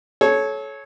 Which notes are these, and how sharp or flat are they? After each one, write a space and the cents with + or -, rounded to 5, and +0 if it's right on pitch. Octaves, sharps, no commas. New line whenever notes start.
A4 -30 C#5 -5